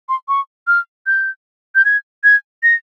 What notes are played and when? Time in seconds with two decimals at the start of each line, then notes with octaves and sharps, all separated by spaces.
0.09 C6
0.28 C#6
0.67 F6
1.07 G6
1.75 G6
1.85 G#6
2.24 G#6
2.63 A#6